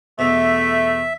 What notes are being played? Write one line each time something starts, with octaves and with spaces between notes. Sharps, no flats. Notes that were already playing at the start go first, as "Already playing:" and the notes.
E2 B2 A3 E5